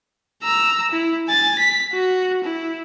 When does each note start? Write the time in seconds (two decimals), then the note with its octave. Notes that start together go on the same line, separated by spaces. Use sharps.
0.43 A#5 E6
0.91 E4
1.28 G#5 A6
1.59 B6
1.92 F#4
2.44 E4